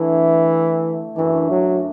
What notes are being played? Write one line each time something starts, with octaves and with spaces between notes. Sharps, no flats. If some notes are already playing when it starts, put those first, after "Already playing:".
Already playing: D3 E3 A3 E4
F#2 D3 E3 A3 D4
F#3